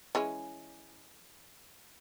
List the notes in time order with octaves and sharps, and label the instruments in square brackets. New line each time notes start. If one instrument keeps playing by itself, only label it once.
[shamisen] E3 G#3 C#4